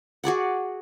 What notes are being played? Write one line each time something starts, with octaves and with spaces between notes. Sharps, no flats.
F#4 G#4 D5 F#5